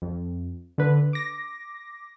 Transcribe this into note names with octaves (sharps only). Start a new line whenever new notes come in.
F2
D3 B4
D6 A#6